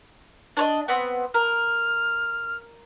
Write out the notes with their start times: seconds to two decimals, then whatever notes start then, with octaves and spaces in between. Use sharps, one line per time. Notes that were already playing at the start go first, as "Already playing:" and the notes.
0.57 D4 C#5 D#5
0.88 B3 C4
1.34 A#4 F6